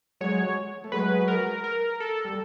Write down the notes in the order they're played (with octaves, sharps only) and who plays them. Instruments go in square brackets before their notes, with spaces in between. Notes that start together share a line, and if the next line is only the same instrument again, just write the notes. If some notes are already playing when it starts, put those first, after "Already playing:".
[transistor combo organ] F#3 G#3 [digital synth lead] C#5
[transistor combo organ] A3
[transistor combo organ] F#3 G#3 [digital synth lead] B4
[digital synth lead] A#4
A#4
A4
[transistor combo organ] G3